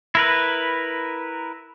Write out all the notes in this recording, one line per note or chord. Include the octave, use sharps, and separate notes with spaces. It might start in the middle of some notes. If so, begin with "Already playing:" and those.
E4 A#4 B4